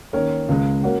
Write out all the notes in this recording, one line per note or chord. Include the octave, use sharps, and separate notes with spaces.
D#3 A#3 C#4 A#4 C#5
C#2 C#3 G#3
A#3 C#4 F#4